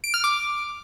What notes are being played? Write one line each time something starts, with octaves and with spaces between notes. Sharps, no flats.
D7
F6
D6